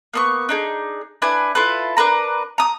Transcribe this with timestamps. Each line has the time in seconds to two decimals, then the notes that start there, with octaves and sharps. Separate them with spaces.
0.14 A#3 B3 C#6
0.49 D4 D#4 G#4
1.22 D4 E4 B4 G#5
1.55 E4 F4 A4 B4
1.97 D4 A#4 B4 A#5
2.58 A#5 D#6